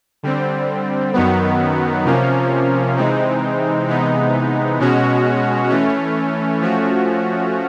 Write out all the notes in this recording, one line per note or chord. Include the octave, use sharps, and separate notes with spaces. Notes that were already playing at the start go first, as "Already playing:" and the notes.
D3 G3 C4
F#2 D#3 F#3 B3
C3 F3 A#3 C#4
C3 E3 G#3 C4 D#4
C3 E3 G#3 B3 D#4
B2 G#3 C#4 F#4
E3 A3 C#4
F3 A3 C#4 F#4